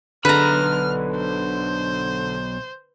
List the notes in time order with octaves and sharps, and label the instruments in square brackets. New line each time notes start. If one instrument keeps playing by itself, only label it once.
[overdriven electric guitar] B1 B5 [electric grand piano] D3 D#7 [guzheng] B4 A#5 [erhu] F6
[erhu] C5